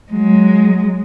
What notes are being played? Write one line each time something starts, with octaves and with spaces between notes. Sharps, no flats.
F#3 G#3